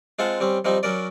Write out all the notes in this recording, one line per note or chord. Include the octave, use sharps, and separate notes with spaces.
G#3 C4 F4 F#5 A5
G3 C4 C#4
F3 G3 C4 D#4
F#3 C#4 A#4 D5